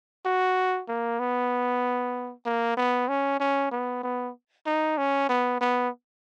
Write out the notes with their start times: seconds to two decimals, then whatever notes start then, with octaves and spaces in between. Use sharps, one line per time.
0.25 F#4
0.88 A#3
1.19 B3
2.46 A#3
2.77 B3
3.09 C#4
3.40 C#4
3.71 B3
4.03 B3
4.66 D#4
4.98 C#4
5.29 B3
5.61 B3